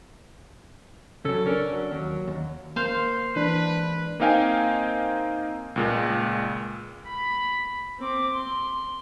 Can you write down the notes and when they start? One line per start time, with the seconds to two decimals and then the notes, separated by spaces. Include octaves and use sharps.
1.25 C#3 F#3 A4
1.46 C#4 D4 A#4
1.72 F#3
1.91 D#2 F#3
2.28 D#2
2.76 A#3 C5 F5
3.36 E3 G#3 D4 B4
4.20 A#3 C4 D#4 F5 G5 G#5
5.76 C#2 A#2 G#3
7.07 B5
8.00 C4 D6
8.34 C6